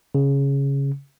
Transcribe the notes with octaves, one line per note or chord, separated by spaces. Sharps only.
C#3